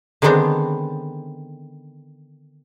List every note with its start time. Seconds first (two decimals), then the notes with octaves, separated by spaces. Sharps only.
0.22 D3 D#3 G#3 B3 C4 D4